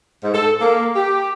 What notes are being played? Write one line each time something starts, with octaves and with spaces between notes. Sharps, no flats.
G#2
A4
A#3
G4